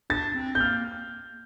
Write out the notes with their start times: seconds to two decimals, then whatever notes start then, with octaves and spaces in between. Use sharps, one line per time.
0.10 D4 A6
0.35 C4
0.55 G6
0.60 A#3 F6